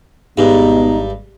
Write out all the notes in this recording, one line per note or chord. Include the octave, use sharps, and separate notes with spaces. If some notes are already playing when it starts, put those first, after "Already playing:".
G#1 G2 B2 G3 G#3 D#4